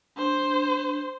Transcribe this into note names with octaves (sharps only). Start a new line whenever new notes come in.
D4 C5